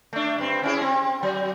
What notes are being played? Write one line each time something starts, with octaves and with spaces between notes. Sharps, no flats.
A3 D4
G2 C4
C#4 E4 G#4
C4
F#3